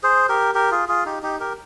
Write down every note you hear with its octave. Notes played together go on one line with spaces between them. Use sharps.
G#4 C5
G4 A#4
G4 A#4
F4 G#4
F4 G#4
D#4 G4
D#4 G4
G4 A#4